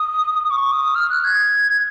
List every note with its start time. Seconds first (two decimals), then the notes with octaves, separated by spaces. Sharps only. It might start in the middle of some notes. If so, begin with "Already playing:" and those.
Already playing: D#6
0.51 C#6
0.72 D#6
0.95 F6
1.10 F#6
1.24 G#6